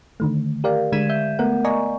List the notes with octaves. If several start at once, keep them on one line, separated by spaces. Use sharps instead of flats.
D3 D#3 A3
G4 A#4 D5 F5
D3 G#3 G#6 B6 D#7 E7
E5 G6
A3 B3 A#4 F#5
D5 D#5 G#5 A#5 C#6